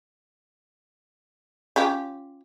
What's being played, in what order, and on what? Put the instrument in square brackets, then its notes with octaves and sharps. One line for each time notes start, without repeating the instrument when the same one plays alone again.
[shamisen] C#4 F4 G4